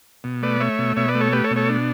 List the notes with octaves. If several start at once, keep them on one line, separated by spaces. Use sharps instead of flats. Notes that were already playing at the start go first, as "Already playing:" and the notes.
B2
A3 B4 D5
A3 C#5 E5
B2
B2 C#5 E5
B4 D5
A3
A4 C#5
A3 G4 B4
A4 C#5
B2
A4 C#5
D4